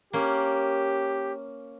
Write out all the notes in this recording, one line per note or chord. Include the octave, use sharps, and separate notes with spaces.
A#3 C#4 G4